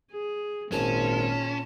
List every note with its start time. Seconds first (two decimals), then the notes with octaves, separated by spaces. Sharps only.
0.12 G#4
0.72 G#1 A#2 C#4 F4 A5